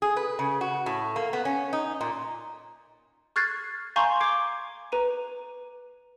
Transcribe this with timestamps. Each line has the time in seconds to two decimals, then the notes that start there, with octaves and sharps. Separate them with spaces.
0.02 G#4
0.17 B4
0.39 C#3
0.61 F#4
0.86 A2
1.16 A#3
1.33 B3
1.45 C#4
1.73 D#4
2.01 A#2
3.36 C#6 F6 F#6 G#6 A6 C7
3.96 F5 G#5 A#5 C6 C#6 G6
4.20 D6 G#6 C7 D7
4.92 B4 A#5 D#7